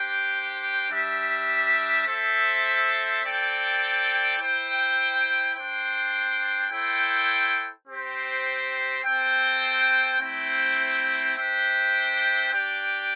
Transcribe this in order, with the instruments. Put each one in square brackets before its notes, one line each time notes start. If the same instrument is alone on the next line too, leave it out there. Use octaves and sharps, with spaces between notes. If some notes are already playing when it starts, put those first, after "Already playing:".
Already playing: [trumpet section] D4 G4 C5 G5
G3 D4 G4 E5
C4 A4 C5 E5
C4 A4 D5 G5
E4 C5 G5
D4 C5 G5
E4 A4 C5 G5
C4 G4 C5
C4 A4 C5 G5
A3 C4 E4 C5 G5
D4 C5 E5 G5
D4 G4 D5 G5